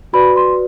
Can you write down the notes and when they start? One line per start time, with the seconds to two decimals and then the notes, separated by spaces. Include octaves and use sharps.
0.13 F#4 B4 D5 B5
0.36 C6